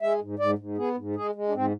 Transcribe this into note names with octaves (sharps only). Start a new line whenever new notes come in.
G#3 E5
G#2
G#2 D5
G#2
B3 G#4
G#2
G#3 G#4
G#3
D4
G#2 C4